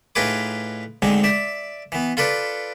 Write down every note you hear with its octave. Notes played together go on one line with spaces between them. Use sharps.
A2 D#4 F4 G#4 B4 D6
D2 G#2 D3 G#3 C4
D5 E5
E3 B3
F4 A4 B4 D5